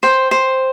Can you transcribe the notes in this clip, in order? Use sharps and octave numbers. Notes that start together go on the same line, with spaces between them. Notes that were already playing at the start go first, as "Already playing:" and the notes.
C5 G5
C5